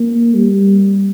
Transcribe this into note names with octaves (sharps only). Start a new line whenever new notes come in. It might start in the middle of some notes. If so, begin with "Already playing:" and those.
Already playing: A#3
G3